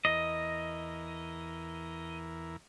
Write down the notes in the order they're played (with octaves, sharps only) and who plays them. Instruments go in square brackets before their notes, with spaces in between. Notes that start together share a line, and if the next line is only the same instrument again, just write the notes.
[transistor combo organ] E2 E3 A#4 [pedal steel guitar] D#5